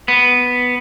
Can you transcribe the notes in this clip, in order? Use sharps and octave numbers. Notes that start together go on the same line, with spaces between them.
B3